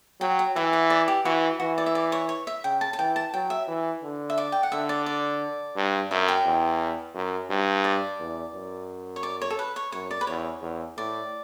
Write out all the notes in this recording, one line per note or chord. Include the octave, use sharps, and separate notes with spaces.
F#3 G5
G5
E3 E5
F#5
D5
G4
E3 F#4
E3 F#4
D5
E5
D5
C#5
C#5
E5
C#3 G5
A5
A5
E3 G5
A5
F#3 G5
E5
E3
D3
E5
D5
G5
F#5
D3 E5
D5
D5
G2
F#2 E5
G5
E2
F#2
G2
D5
E2
F#2
C#5
D5
C#5
A4
B4
C#5
F#2 C#5
D5
B4
E2 C#5
E2
A2 D5